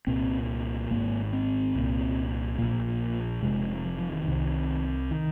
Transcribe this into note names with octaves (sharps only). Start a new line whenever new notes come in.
C2 A#2 C4
G#1 G#2 A#3
C4
C2 A#2
A#1 A#2 A#3
F1 F2 C3 G#3
F3
F3
D#3
C2 C3
D#3